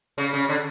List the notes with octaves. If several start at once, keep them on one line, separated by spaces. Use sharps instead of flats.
C#3
C#3
D3